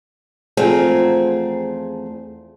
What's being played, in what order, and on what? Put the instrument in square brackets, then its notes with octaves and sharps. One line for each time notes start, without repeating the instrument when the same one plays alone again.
[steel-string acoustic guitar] E2 F3 A3 C4 G#4 A#5